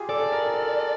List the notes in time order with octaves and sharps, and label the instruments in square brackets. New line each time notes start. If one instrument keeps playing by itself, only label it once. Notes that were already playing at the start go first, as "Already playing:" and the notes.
Already playing: [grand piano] F4 G4 G#4
[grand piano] A4 [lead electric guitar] D5
[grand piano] A#4
A4